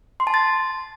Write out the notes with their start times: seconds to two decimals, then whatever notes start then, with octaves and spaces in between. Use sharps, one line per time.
0.20 C6
0.27 A5
0.34 A6